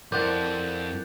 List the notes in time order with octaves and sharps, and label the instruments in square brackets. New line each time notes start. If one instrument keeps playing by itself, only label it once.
[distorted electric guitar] F2 [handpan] E4 A#4 [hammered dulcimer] D5 F#5 [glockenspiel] G6 A6